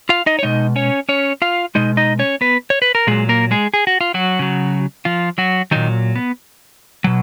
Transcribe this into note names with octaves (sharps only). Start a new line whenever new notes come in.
F4 F5
D#4 D#5
C#5
B2 G#3 D#4 D#5
C#4 C#5
C#4 C#5
F4 F5
B2 G#3 D#4 D#5
D#4 D#5
C#4 C#5
B3 B4
C#5
B4
A#4
A#2 F#3 G#3 G#4
A#3 A#4
G#3 G#4
G#4
F#4
F4
F#3 F#4
C#3 F#3
F3 F4
F#3 F#4
A#2 D#3 F#3 D#4
B3
B2 F#3